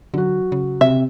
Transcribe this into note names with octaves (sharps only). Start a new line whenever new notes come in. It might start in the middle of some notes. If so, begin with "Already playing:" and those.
D3 F#3 F#4
C#3
C3 E5